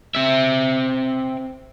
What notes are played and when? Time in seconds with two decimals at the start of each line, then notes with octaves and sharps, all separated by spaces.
0.15 C4 E5